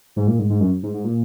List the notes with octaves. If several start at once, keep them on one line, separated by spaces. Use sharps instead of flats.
G#2
A#2
G#2
G#2
F#2
G#2
G#2
A#2